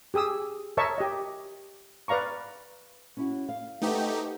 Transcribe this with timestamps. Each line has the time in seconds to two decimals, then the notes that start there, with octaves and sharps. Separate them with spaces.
0.14 G4 G#4 D#6 E6
0.77 A#4 C#5 D#5 E5 A5 C#6
0.98 G4 D#5
2.08 B4 D5 F5 A#5 C#6
3.17 C#4 E4 F#4
3.49 F5
3.82 A3 D#4 G4 B4 C5 F#5